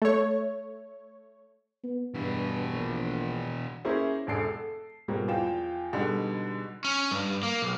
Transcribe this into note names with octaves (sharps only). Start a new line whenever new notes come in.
A3 C#5
B3
G2 B2 E3
A#1
A#3 C#4 E4 G#4 C5 E5
E1 A#1 D3 A4 C7 D7
A4
B2 F3 G3 G#3 A#3 C4
E2 F3 F5 G5 E7
B2 D3 G3 G#3 D#4
C#4
G2
A#3
B1